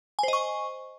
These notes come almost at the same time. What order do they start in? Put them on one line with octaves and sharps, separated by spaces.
G#5 C5 D#5 C#6